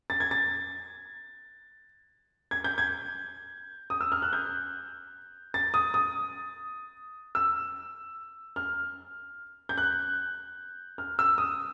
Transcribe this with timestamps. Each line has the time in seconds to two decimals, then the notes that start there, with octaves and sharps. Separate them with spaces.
0.10 A6
0.20 G#6
0.31 A6
2.51 G#6
2.64 G6
2.78 G#6
3.90 D#6
4.01 E6
4.12 F6
4.22 F#6
4.33 G6
5.54 A6
5.74 D#6
5.94 D#6
7.35 E6
8.56 F6
9.69 G6
9.78 F#6
10.98 F6
11.19 E6
11.38 D#6